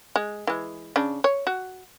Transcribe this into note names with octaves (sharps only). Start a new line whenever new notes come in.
G#3
E3 G#3
C#3 D4
C#5
F#4